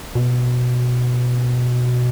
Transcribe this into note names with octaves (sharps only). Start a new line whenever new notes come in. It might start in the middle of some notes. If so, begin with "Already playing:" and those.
B2